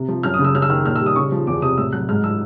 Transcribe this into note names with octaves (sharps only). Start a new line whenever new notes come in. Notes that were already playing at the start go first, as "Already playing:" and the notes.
Already playing: C3
F3
F#2 F6
D#6
C#3
E6
F#2 F6
E6
D#3 F6
A#2 F6
E6
G3
D#6
C#3 C#6
F3
E2 D6
C3 D#6
A2 E6
F#3 F#6
G#2 F6
F3 E6